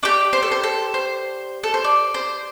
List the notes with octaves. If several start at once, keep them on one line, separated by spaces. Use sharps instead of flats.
D4 G4 D6
C5
A4
C5
A4
C5
A4
C5
D5
C5